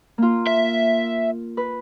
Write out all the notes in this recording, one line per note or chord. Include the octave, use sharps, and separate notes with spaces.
A#3 F4
E5
B4